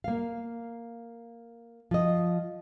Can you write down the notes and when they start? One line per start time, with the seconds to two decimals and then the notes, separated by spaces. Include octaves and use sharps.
0.04 A#3 F5
1.91 F3 D#5